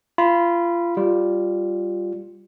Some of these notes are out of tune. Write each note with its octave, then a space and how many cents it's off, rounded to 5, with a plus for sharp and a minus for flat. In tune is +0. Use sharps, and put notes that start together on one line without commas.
F4 -25 B5 -10
G3 +0 F4 +5